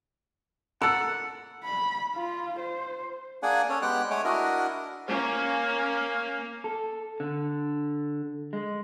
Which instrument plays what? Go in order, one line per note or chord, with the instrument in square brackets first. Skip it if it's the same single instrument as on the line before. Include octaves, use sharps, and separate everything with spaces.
[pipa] A4 A#4 [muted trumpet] F#5 [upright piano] E6
[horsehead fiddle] B5
F4
C5
[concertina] A#3 D4 G#4 D5 F#5 G#5
C#4 D4 A4 C#5
G#3 B3 G4 F#5 G5 F#6
G#3 A3 C#5 F#5 G#5 D6
D4 E4 F#4 A#4 D#5 F#5
[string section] A#3 C#4
[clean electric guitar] A4
D3
G#3